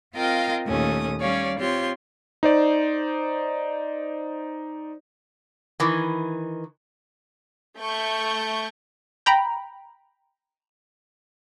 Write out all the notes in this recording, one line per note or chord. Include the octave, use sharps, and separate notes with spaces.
C4 F4 A#4 D#5 F5 G5
D#2 A#2 A3 C#4 D#6
G3 C#4 C#5 D5 F5
C4 F4 G4 C#5 C6
D#4 C5 D5
D#3 E3
A3 C#6 G6
G5 A#5 B5